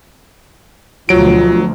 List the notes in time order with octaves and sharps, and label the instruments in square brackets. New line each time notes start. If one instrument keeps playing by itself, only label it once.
[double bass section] D2 B2 F3 [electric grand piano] F#3 D7 [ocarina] F4